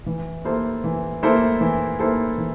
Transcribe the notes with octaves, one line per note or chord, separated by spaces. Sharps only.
E3
A#3 E4 A4 C5
E3
A#3 E4 A4 C5
E3
A#3 E4 A4 C5
E3